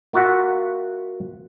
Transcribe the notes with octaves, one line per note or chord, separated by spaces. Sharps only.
A#3 F4 F#4 E5 F#5